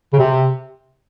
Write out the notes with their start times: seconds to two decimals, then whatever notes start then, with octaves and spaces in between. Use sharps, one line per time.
0.13 C#3
0.18 C3